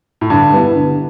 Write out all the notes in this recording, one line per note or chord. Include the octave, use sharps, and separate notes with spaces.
A2
G2 D3
G3 B3 E4
D3